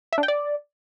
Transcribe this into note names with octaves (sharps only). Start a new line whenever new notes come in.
E5
D4
G5
D5